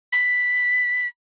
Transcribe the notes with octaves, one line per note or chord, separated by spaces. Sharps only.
B6